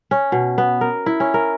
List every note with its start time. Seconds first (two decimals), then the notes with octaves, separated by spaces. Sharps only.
0.11 C#4
0.32 B2
0.58 B3
0.81 A#4
1.06 E4
1.20 C#4
1.34 A#4